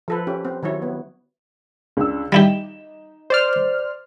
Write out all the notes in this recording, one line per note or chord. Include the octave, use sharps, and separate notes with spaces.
F3 A4 B4
C#4 G4
C4
D#3 F#3 E4 C#5
B3
C#2 D4 E6
G3 D#4 E4 G4 E7
C5 D5 F6